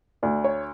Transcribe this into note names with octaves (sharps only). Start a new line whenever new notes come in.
D2 D5
C#5